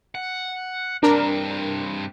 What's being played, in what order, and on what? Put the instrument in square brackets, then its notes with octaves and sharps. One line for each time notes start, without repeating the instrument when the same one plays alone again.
[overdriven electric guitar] F#5
[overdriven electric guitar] G2 C4 [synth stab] D4 A#4